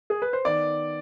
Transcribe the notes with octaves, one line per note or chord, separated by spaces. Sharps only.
G#4
B4
C5
D#3 B3 D5